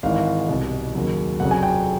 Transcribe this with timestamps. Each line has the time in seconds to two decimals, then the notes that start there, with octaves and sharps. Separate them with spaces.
0.03 G#1 G#2 E3 F5
0.49 C2 B2 G3
0.95 D#2 C#3 F#3
1.40 F1 F2 C#3 F#3 F#5
1.51 G#5
1.63 G5